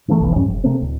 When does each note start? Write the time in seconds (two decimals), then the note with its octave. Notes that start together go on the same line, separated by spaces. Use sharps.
0.08 D3 E3 G#3 A3
0.20 F1 B1 E3
0.36 F2 G#2 G3 C#4
0.49 F1
0.64 C3 A3 A#3 C4
0.80 D1